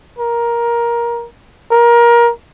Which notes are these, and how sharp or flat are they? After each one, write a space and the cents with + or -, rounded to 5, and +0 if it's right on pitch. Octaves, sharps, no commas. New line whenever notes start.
A#4 +15
A#4 +20